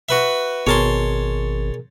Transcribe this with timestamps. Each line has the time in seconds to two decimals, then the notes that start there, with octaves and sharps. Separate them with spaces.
0.09 F#4 B4 E5
0.67 G#1 B2 G#4 A#4 C#5 A5 C6